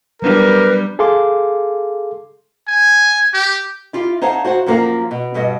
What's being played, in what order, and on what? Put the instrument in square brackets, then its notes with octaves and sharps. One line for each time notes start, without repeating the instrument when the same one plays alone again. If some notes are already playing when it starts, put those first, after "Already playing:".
[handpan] F#3 B3 D4 [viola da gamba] G3 [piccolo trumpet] A#4 [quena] B4
[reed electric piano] G#4 A4 F5 C6 D6
[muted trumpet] G#5
G4
[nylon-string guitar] E4 F4 G4 F5
D#4 C5 C#5 F5 F#5 A5
F#4 C5 F5 F#5
F#2 F3 A#3 F#4 A#4 F5
B2
G2 B2 G3 D#5